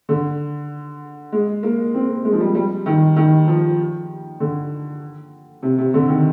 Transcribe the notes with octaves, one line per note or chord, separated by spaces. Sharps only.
D3
G#3
A#3
C4
A#3
G#3
F3
G3
G3
D#3
D#3
F3
D3
C3
C3
D3
D#3